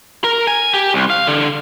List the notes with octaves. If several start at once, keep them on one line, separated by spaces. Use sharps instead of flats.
A#4
G#5
G4
C2
F5
D3